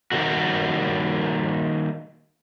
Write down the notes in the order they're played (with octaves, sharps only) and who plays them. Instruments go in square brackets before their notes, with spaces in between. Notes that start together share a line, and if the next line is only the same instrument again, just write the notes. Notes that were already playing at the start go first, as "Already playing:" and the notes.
[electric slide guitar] D#3 G3 A#3 F#4